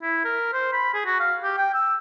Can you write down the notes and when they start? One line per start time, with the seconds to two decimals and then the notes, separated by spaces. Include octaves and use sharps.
0.02 E4
0.25 A#4
0.53 C5
0.73 B5
0.94 G#4
1.05 F#4
1.20 F5
1.43 G4
1.57 G5
1.74 E6